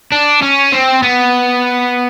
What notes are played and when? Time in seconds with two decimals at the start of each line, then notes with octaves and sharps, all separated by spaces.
0.12 D4
0.42 C#4
0.72 C4
1.03 B3